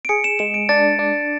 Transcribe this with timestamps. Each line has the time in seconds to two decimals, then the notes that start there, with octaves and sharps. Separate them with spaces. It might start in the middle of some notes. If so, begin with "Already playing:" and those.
0.05 D7
0.09 G#4 C#7
0.24 E7
0.39 G#3 E7
0.54 D7
0.69 D4 A6
0.99 D4